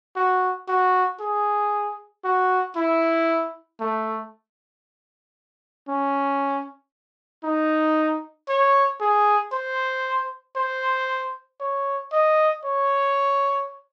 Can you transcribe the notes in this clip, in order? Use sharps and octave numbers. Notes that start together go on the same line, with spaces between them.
F#4
F#4
G#4
F#4
E4
A3
C#4
D#4
C#5
G#4
C5
C5
C#5
D#5
C#5